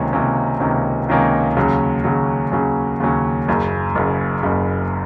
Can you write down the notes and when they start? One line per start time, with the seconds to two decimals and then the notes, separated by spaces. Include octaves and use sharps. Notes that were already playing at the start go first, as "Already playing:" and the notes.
Already playing: C#2 C3 D#3 A#3 C#4
0.13 C#2 C3 D#3 A#3 C#4
0.60 C#2 C3 D#3 A#3 C#4
1.09 C#2 C3 D#3 A#3 C#4
1.56 D#2 C#3 F#3 C#4
2.04 D#2 C#3 F#3 C#4
2.52 D#2 C#3 F#3 C#4
3.00 D#2 C#3 F#3 C#4
3.48 F#1 F#2 C#3
3.95 F#1 F#2 C#3
4.43 F#1 F#2 C#3